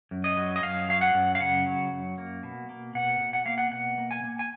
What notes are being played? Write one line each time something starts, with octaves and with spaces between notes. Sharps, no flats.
F#2
D#5
F#3
D#5
F#2 F5
F#3 F5
F#5
F#2
F5
C#3 F#5
F#3
F#2
A#3
B2
A#3
B2 F#5
B2
F#5
A#3 F5
F#5
B2 F#5
A#3
G#5
A#3
G#5